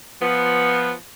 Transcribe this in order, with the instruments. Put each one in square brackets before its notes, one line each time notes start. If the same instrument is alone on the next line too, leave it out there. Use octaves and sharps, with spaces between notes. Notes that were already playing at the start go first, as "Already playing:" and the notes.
[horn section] F3 B3